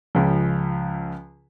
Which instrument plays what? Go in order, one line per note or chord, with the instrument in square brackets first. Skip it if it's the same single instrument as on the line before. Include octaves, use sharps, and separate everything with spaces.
[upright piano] C#2 C#3 F3